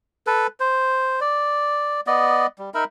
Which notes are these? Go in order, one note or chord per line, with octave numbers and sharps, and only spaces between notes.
A4 B4
C5
D5
B3 D5 D#5
G3
D#4 A#4 E5 B5